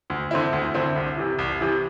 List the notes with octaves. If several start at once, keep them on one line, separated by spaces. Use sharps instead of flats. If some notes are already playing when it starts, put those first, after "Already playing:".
D2
D3 C4 E4
D2
D3 C4 E4
C2
C3 E3
C2
C3 E3